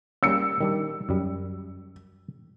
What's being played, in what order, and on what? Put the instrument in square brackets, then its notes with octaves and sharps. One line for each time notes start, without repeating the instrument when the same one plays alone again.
[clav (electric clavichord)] G3 A#3 C#4 [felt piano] E6 C#7
[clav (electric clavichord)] D#3 G3 D4
F#2 G3